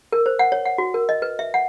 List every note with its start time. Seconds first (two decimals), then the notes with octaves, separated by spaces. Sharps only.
0.12 A#4
0.26 C5
0.39 F#5
0.52 C#5
0.66 F#5
0.78 F#4
0.94 A#4
1.09 D#5
1.22 B4
1.39 E5
1.54 F#5